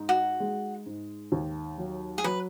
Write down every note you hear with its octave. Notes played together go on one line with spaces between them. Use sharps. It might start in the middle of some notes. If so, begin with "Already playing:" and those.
Already playing: G#2 D#4
F#4
G#3
G#2
D#2
F#3
G#4
F#3 B4